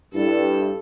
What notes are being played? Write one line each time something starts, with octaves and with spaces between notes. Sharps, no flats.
G2 E4 A4